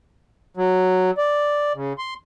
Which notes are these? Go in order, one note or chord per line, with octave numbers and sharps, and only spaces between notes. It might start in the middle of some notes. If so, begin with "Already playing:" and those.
F#3
D5
C#3
C6